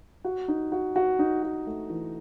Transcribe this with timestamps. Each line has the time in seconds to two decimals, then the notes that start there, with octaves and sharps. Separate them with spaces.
0.25 F#4
0.48 D#4
0.72 F#4
0.96 F#4
1.19 D#4
1.43 F#4
1.67 A3
1.90 E3